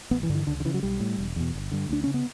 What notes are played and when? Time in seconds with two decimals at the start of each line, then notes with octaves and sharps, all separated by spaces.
0.11 A1 B3
0.23 E3
0.30 G2 D3
0.35 E3
0.47 C#2 D3
0.60 D3
0.65 C#3 E3
0.74 F#3
0.83 B1 G3
1.00 A2
1.18 E1
1.36 E2 B2
1.54 G1
1.72 G2 D3
1.89 D2 D4
2.04 C#3 C#4
2.14 B3